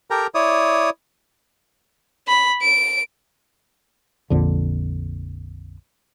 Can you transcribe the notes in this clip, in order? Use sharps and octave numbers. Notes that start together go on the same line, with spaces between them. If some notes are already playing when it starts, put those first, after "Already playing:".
G4 A4 A#4 G5 A#5
E4 C#5 D5 D#6
B5
D7
A#1 F2 D3